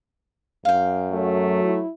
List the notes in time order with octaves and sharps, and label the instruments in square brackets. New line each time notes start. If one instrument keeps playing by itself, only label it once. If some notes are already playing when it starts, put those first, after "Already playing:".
[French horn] F#2 [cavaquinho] F5 G5
[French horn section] F#3 [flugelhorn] A3
[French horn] E4